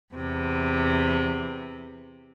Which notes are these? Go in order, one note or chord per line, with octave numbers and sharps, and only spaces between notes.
E2 C3